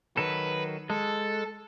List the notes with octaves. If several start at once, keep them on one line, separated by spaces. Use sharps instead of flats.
D#3 F#3 A4 B4
G#3 A4